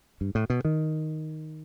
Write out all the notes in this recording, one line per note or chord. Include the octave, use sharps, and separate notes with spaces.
G2
A2
B2
D#3